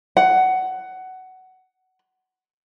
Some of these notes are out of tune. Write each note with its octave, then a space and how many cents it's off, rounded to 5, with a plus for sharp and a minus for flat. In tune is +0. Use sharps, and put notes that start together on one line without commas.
F#5 +15